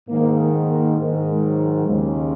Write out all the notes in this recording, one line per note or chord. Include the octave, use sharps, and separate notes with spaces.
G#2 D#3 A#3
A#3
G#2 D#3 G#3
F#3
D#2 C#3 G#3